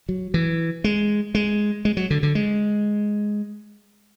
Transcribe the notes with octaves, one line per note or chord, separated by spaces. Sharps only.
F#3
E3
G#3
G#3
G#3
F#3
D3
D3
G#3